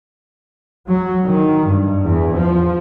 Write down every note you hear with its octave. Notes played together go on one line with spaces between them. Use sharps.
F#3
D#3
G2
E2
F3